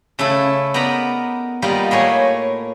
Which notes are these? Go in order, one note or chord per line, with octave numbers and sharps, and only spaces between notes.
C#3 A3 E4 A4
B3 D#4 A#4 D5 A#5 B5
G3 A#3 B3 D#4 F4
A2 A#3 G#4 C#5 G#5